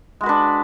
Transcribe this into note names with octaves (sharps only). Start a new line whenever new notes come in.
G#3 D4 F#4 B4